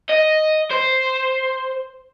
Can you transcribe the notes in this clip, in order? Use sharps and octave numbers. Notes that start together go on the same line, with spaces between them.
D#5
C5